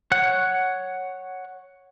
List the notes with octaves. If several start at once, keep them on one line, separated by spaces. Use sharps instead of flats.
C#5 F#5 F#6